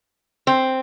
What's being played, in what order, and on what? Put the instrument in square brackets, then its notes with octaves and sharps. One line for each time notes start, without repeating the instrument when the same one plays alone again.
[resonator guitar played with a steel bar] C4